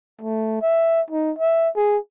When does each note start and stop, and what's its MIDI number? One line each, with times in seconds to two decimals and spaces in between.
0.21 0.58 57
0.62 1.01 76
1.10 1.32 63
1.39 1.69 76
1.76 1.97 68